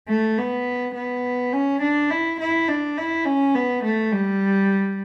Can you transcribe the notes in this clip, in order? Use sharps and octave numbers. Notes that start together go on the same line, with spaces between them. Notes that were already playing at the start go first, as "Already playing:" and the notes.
A3
B3
B3
C#4
D4
E4
E4
D4
E4
C#4
B3
A3
G3